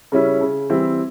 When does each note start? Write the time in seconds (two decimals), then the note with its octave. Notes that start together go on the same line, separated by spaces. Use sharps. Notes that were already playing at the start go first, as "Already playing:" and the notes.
0.12 C#3 G3 C#4 E4
0.41 C#3
0.70 E3 G3 C4 E4